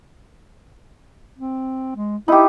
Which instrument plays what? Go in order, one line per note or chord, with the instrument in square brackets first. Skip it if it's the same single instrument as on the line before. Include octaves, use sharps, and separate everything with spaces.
[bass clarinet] C4
G#3
[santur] D#4 G4 [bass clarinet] E4